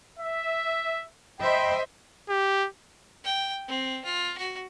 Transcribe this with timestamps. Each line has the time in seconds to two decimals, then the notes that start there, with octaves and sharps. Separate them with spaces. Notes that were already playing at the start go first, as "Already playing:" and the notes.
0.20 E5
1.39 C5 D#5 E5 G5 B5
2.29 G4
3.24 G5
3.68 C4
4.05 F4
4.38 F#4